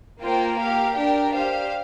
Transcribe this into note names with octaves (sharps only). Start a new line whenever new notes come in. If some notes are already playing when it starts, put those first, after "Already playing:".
A#3 F4 C5 G5
G4 A#4 F5
D4 G4 A#4 G5
G4 C5 F5